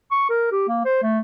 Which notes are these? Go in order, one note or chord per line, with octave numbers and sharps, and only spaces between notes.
C#6
A#4
G4
A#3
C5
A3